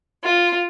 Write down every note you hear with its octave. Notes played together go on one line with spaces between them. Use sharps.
F4